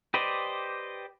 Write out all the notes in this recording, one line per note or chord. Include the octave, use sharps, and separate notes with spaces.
G4 B4 C5 D5 D#5